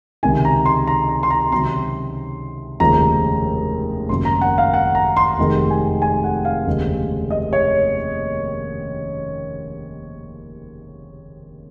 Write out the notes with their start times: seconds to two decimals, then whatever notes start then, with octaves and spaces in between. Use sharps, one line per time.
0.23 C#2 C3 D#3 G#5
0.45 A#5
0.66 C6
0.87 A#5
1.09 A#5
1.23 C6
1.30 A#5
1.51 C#2 C3 D#3 F#3 C4 C6
2.80 F1 D#2 C#3 F3 G#3 A#5
4.09 G#1 F#2 C#3 F#3 A#3 C6
4.25 A#5
4.41 F#5
4.58 F5
4.73 F#5
4.95 A#5
5.17 C6
5.38 F1 F2 D#3 G#3
5.70 G#5
6.02 G#5
6.24 F#5
6.45 F5
6.66 F1 D#2 C#3 G#3
7.31 D#5
7.53 C#5